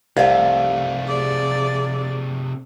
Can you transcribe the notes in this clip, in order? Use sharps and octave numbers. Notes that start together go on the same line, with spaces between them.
C2 C3 A3 A4 F5
G#4 D5